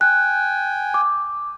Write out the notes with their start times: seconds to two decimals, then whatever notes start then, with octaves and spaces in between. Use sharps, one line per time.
0.01 G5 G#5 F#6
0.94 D6